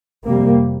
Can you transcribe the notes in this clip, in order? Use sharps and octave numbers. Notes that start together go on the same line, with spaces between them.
F2 C3 G3 A#3